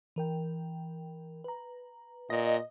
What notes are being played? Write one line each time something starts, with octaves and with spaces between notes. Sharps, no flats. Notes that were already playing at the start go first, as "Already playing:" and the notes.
E3 A#4 G5
B4 A#5
A#2 D#5